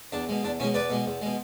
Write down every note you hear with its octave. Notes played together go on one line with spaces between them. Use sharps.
E2 D4
B2 G#3
E2 D4
B2 G#3 C#4 E4
E2 B4 D5
B2 G#3
E2
B2 G#3